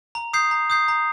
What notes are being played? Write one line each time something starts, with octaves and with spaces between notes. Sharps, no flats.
A#5
D#6 G6 C7
A#5
D#6 G6 C7
A#5